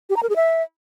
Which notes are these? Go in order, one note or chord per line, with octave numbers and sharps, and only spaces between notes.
G4
A#5
A#4
G#4
E5